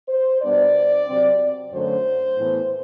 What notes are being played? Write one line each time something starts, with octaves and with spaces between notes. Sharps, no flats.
C5
B2 G3 B3 D4 D5
C3 F#3 C4
F#2 D3 F#3 A3 C5
A2 E3 B3